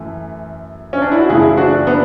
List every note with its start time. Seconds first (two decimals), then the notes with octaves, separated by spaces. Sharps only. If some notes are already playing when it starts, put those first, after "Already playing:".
Already playing: F#2 E3 A3
0.93 C#4
1.02 D4
1.12 E4
1.20 F#4
1.29 F#2 C#3 E3 A3 E4 G#4
1.57 D4 F#4
1.87 B3 D4